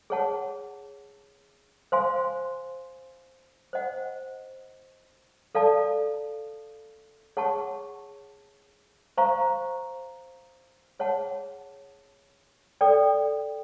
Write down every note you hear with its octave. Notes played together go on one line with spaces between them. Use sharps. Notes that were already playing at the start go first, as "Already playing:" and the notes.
G#4 C#5 F#5 A5
C5 F5 G#5 C6
C5 D#5 F#5
A4 D5 F5 A5
G#4 C#5 F#5 A5 C#6
C5 F5 A#5 C#6
G#4 C#5 F#5 A5
A4 D5 G5